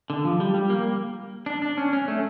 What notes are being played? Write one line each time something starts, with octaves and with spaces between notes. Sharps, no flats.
D3
F3
G3
G3
A#3
D4
D4
C#4
C#4
A3